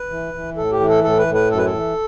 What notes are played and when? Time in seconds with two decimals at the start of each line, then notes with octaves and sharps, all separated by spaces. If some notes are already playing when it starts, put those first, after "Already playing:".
Already playing: B4
0.10 E3
0.34 E3
0.57 A2 A4
0.72 G4
0.80 E3
0.89 A4
1.04 A2 A4
1.19 B4
1.27 A2
1.34 B4
1.51 F#2 A4
1.58 B4
1.65 A4
1.74 E3